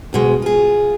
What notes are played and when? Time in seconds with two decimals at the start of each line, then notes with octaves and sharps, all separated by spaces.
0.13 D2 B2 G#3
0.42 F4 G#4